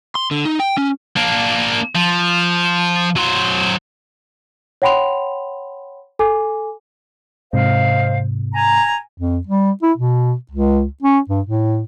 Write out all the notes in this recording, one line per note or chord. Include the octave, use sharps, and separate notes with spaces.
C6
D3
D#4
G5
C#4
A#3 D4
F3
F#3 C5
C#5 F#5 G5 B5 C6 F7
A4 G#5 D6
G#2 C3 C5 D#5 F5
G#5 A#5
F2
G3
E4
B2
C#2
C#4
G2
A2